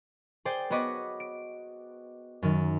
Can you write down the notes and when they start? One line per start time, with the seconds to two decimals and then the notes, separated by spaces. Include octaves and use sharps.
0.45 G#4 C5 D5 G5
0.70 B3 F#4 C#5 D#5 B5 D6
1.20 D7
2.42 F#2 D#3